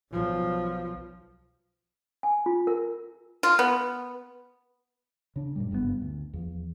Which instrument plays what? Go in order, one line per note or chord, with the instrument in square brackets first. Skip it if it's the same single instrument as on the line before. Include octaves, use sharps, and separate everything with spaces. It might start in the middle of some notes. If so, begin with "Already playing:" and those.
[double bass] B1 F3
[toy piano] G#5
F4
A#4
[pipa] F4
B3
[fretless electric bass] C#3 D4
F#2 A#2 G3
F#1 G2 B2 B3
D2
E2 F3